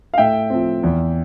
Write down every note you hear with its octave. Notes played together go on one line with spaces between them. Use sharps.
F5
A2 E5 G5
F3 C4
E2